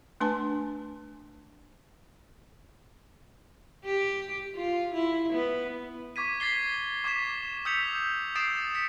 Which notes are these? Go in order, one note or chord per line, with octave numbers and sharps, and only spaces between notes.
A3 D4 B4 G#5 A5
G4
F4
E4
B3
C#6 D6 G#6 B6 D#7
G#6 A6 B6 C7 G7
C#6 D6 G#6 B6 E7
D#6 E6 G6 B6 C#7 F7
D#6 A6 C7 D7 E7
B6 C#7